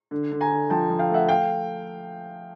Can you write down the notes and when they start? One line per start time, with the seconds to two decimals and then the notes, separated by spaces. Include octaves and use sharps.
0.11 D3
0.32 D3
0.41 G#5 A#5
0.51 D3
0.70 F3 G5 A5
0.90 F3
0.99 F5 G5
1.09 A3 E5 F#5
1.29 F5 G5